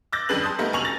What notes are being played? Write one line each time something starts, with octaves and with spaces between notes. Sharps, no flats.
D6 E6 F#6 G6 A6 A#6
G1 F2 D4 G#4 B4 F#7
A5 C6 D#6 G6
G3 A3 B3 D#4 A#4
F1 F#2 G#5 C#6 F7 F#7
A6 A#6